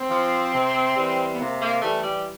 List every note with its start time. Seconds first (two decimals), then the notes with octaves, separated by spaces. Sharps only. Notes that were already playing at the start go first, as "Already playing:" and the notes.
Already playing: C4
0.09 F3
0.52 C3
0.95 E3 G3
1.31 B3
1.39 C3 A#3
1.61 A#3
1.82 E3 G3 A3
2.03 G3